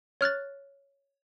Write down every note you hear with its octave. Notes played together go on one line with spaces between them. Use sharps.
C#5 F6 F#6 A6